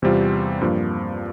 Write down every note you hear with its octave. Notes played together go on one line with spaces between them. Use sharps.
E2 C3 G3 C4 F4
G2 F3 A#3